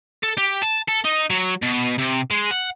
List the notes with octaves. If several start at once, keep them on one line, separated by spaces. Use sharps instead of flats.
A4
G4
A5
A4
D#4
F#3
B2
C3
G#3
F#5